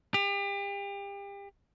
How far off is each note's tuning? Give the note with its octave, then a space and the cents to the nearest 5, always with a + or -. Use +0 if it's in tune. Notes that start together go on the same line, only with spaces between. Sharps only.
G4 +35